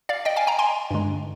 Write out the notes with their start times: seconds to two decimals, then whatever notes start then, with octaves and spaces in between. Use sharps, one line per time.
0.09 D5 F5
0.25 D#5 G5
0.36 F5 G#5
0.47 G5 A#5
0.59 G#5 C6
0.91 G2 D3 G#3